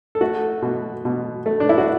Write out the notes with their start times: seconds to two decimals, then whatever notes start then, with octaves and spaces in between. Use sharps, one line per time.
0.15 A4
0.21 A3 F#4
0.62 B2
1.05 B2
1.46 A3
1.60 D4
1.69 E4
1.78 F#4